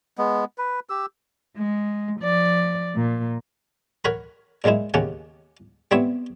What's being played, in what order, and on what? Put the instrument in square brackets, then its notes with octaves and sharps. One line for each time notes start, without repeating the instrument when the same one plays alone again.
[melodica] G#3 B3
B4
G4 E6
[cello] G#3
F3 D5
A#2
[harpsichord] A#4 C#5 F#5 A#5 B5
A#2 F#3 G#3 D#4 E4
D#2 C#3 C#4 G4 F#5
G3 B3 C4 E4 C#5 E5